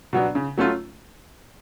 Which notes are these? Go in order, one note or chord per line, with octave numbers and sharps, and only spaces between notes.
B2 F#3 B3 D4
C#3
F#3 A3 C#4 F4